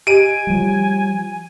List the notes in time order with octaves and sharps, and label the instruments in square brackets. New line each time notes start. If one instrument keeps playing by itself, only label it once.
[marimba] G4 D#5 A#5 [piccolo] G#5 [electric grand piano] D7 D#7
[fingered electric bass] F3 G3